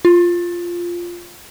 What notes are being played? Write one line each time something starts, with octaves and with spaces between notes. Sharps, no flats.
F4